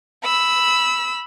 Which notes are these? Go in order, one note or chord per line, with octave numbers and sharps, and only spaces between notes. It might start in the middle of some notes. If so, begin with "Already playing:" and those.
B5 E6